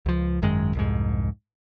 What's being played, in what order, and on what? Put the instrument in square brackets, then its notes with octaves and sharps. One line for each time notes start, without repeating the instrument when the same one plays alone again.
[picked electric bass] C#2 F3
G#1 F#2 D#3 G#3
C2 F2 G#2